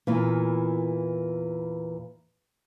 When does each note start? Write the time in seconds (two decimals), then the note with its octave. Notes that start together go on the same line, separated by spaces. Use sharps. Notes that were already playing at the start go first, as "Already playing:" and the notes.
0.07 E2 A#2 E3